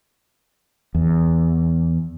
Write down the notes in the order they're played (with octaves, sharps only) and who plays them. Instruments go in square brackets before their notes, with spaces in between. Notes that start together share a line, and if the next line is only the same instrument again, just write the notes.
[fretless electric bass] E2